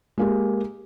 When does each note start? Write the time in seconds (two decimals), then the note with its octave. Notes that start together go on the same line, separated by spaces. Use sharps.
0.18 G#3 A#3 G4